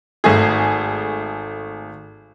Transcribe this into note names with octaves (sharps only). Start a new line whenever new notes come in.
G#1 A3 G#4